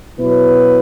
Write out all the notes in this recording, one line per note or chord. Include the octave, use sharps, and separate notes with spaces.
B2 F#3 E4 B4